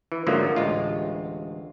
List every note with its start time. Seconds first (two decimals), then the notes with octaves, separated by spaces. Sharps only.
0.12 E3
0.27 G#2 D3 F3 F#3 A3 A#3
0.56 A1 D2 G#3 F4